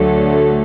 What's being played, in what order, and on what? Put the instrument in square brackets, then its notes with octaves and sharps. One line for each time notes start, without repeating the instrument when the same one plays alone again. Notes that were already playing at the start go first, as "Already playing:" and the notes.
Already playing: [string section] D2 D3 F#3 A3